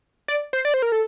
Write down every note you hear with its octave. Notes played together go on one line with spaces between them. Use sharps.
D5
C5
D5
C5
A#4
A4